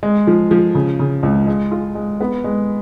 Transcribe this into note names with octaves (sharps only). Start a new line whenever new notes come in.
G#3
F3
F3
C#3
C#3
C#2
G#3
F4
G#3
B3
G#3